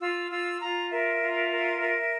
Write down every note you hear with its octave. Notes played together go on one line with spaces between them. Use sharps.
F4 E6
F4 E6
F4 A#5
A#4 E5
F4
A#4
A#4